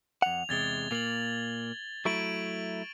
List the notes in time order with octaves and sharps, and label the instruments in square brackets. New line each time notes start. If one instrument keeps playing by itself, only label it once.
[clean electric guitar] F2 F#5 [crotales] F7
[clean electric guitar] E2 C3 G#3 [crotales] G#6 A6 G7
[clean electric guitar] A#2 A#3 [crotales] F7 F#7
[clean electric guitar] F#3 A3 E4 [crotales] C#6 D7 F#7